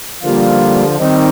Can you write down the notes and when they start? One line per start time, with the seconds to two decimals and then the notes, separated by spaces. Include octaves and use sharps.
0.23 D3 F3 G3 A#3 F4
0.99 D#3 G3 C4 D#4